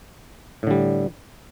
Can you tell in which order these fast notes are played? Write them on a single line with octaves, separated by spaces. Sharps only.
A2 D3 G3